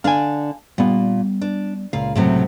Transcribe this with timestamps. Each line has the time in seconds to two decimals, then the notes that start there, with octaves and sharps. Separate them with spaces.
0.04 D3 D4 F5 G#5
0.78 A#2 G3 B3
1.41 D4
1.93 C#2 A#2 F5
2.15 A2 C3 F#3